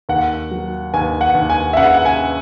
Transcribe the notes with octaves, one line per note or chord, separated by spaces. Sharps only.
D#2 F#5
F#3
D#2 G#5
F#5
D#2
G#5
E5
C#3 F#5
F#5
G#5